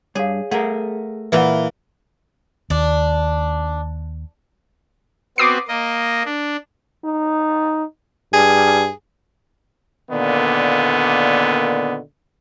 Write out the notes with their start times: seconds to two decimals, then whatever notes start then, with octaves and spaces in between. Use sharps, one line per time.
0.15 G2 G#4 C#5 F5
0.51 A3 G#4 A#4 F#5
1.32 A#2 E3 A#3 E4 B4 F#5
2.70 D#2 D4
5.38 B3 C4 F#4 D6 D#6 C7
5.68 A#3 D#5
6.25 D4
7.04 D#4
8.33 G2 G#4
10.11 A#2 D3 D#3 A#3 B3